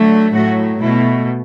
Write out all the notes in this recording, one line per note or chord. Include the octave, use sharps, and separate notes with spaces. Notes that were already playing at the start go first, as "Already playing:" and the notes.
Already playing: D3 F#3 A3
A2 F#3 A3 F#4
B2 A3 E4